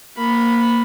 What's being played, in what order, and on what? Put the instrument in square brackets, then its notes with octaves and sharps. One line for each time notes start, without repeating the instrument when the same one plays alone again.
[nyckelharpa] A#3 B5